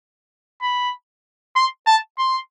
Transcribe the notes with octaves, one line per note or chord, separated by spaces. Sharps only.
B5
C6
A5
C6